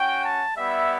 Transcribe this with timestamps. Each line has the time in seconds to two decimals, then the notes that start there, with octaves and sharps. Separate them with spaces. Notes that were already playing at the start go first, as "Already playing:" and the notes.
Already playing: C#4 F#4 G5
0.24 A5
0.56 G3 B3 E4 E5